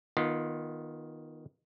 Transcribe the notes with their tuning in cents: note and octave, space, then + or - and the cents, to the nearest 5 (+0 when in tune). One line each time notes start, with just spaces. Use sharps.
D#3 +0 B3 -25 F4 +0